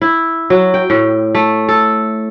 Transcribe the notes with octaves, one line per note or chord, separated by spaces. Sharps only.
E4
F#3
G5
A2
A3
A4